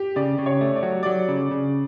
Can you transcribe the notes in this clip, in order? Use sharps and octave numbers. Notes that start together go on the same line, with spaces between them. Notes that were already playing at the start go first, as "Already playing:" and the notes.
Already playing: G4
C#3 D5
C#3
C#5
A3
D5
F#3
F#3 D5
C#3
C#3